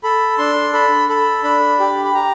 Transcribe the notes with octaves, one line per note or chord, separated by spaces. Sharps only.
A4 B5
D4 C6
A4 B5
A4 B5
D4 B5
G4
B5
G4 A#5